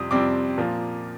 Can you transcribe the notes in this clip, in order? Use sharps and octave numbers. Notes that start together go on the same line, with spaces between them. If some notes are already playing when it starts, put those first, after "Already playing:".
Already playing: F2 C3 G3 C4 D#6
F2 C3 G3 C4 D6
A#2 F3 A#3